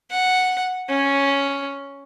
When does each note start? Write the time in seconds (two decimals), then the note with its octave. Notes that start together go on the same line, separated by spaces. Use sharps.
0.11 F#5
0.89 C#4